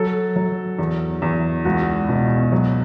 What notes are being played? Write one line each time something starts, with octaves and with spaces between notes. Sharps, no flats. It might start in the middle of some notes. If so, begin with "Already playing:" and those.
Already playing: F#3 A4
F#3
E2
E2
C#2 F#4
B2
F#3